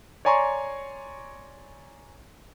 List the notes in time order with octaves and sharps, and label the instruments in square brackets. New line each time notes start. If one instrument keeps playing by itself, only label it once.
[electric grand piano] C#5 D5 G#5 A#5 C6 C#6